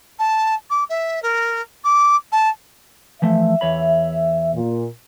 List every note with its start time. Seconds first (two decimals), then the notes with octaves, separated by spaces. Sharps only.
0.19 A5
0.70 D6
0.90 E5
1.23 A#4
1.84 D6
2.32 A5
3.22 E3 F3 A3 E5
3.61 E2 C#5 B5
4.54 A#2